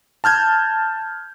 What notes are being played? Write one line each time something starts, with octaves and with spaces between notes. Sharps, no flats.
A5 F6 G6 G#6